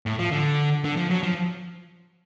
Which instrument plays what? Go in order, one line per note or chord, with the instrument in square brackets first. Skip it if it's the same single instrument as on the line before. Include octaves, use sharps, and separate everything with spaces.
[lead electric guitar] A2
F3
D3
D3
F3
F#3
F3